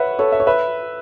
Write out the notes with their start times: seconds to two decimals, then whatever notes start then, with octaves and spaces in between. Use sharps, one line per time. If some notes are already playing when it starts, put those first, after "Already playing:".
Already playing: B4 C#5 E5 F#5 B5
0.19 A4 C#5
0.32 E5
0.40 C#5
0.47 B4 E5